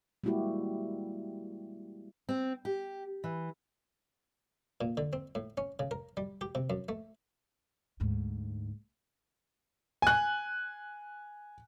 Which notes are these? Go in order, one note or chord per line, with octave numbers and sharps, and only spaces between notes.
G3 G#3 A#3 E4 F#4 G4
C4
G4
E3
A#2
D3
C4
A2
C#4
C#3
A#4
G3
G4
C3
F#2
A3
D2 G#2
G#5 F#6